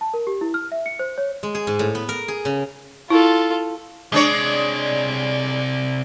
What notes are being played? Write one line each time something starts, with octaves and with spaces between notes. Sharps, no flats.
A5
A#4
G4
E4
F6
E5
C#7
C5
C#5
G#3
G#4
G#2
A2
B3
A#4
G#4
C#3
E4 F4 A4
C3 G#3 D4 C#5 D5